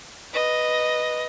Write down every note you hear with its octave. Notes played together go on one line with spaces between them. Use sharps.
B4 D#5